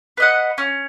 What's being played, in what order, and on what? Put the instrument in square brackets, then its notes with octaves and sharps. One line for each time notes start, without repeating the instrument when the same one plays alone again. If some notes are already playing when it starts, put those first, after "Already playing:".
[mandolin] B4 D#5 F#5
C#4